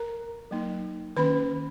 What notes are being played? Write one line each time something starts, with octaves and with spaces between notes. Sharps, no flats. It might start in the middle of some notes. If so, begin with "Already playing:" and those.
Already playing: A#4 A#5
F#3 A#3 D#4
D#3 A#3 C#4 B4 B5